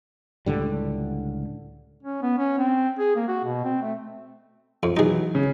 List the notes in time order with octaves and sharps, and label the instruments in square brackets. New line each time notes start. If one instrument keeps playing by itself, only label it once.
[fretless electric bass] C#2 A2 D3 G3
[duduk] C#4
B3
C#4
C4
G#4
A#3
F#4
B2
C4
A3
[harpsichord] F2
[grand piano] E3 F#3 [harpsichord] D#4 G#4
[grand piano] C#3